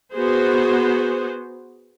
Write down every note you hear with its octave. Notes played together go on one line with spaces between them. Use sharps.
B3 F#4 G#4 C5